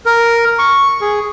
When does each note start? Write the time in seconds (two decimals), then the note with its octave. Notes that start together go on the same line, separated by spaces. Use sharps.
0.06 A#4
0.59 C#6
1.01 G#4